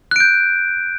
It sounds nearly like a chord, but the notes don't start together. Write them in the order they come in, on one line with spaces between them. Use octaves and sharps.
F#6 D7 G6